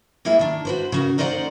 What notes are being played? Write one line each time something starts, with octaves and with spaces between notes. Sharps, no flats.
G3 A#3 E4 G#4 E5
D#3 D4
F#4 B4 C5
C#3 F#4 A#4
A#3 D#4 C5 D5 D#5 F#5